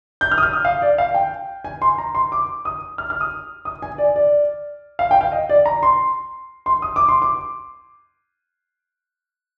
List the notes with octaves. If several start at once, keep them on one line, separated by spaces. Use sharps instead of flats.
G6
F6
D#6
F6
D#6
F5
D5
F5
G5
G#5
C6
A#5
C6
D6
D#6
F6
F6
D#6
D#6
G#5
D5
D5
F5
G5
F5
D#5
D5
A#5
C6
C6
D#6
D6
C6
D6